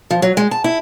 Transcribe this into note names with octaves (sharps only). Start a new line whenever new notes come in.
F3
F#3
G#3
A5
E4